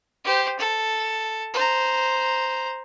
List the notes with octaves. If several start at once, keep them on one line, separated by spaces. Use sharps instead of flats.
G4 C5
A4
C5 A#5